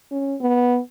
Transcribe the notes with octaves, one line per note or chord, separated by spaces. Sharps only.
C#4
B3